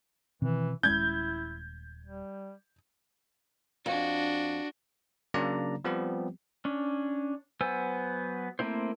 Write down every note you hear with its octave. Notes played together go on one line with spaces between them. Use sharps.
B2 D#3 E3 C4
D#1 G#3 C#4 E4 G6 G#6
G3
F2 D4 F#4
C#3 F#3 A#3 D4 D5 A#5
F3 G3 B3 C4 G4
C#4 D4
F#3 B3 C5 G#5 E6
A3 A#3 C4 E4 C5